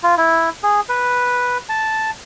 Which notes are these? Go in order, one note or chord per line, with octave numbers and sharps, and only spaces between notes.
F4
E4
G#4
B4
A5